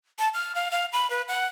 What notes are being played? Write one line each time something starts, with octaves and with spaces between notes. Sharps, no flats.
A5
F6
F5
F5
B5
B4
F#5